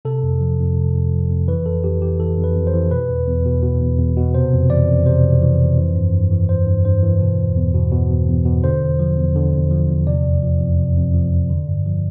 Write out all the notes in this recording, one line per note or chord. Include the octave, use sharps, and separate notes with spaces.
C3 A4
F2
F3
F2
C3
F2
F3
F2
E3 B4
F2 A4
F2 G4
E3 G4
E3 A4
F2
B4
F2
C5
E3
B2 B4
E2
E2
B2
B2
E2
E2
B2
C3 C5
F2
E3 D5
F2
C3 C5
F2
E3
F2
E3
G2
G2
E3
E3 C5
G2
G2 C5
E3
B2
E2
E2
B2
B2
E2
E2
B2
D3 C5
E2
F3
E2
D3
E2
F3
E2
C3 D5
F2
F3
F2
C3
F2
F3
F2
D3
G2
F3